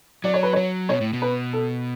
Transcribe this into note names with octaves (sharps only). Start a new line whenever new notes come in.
F#3 D5
C#5
B4
F#3 C#5
B2 C#5
A2
B2
B4
A4